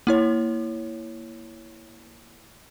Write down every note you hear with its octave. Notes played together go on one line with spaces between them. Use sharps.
A#3 E4 C#5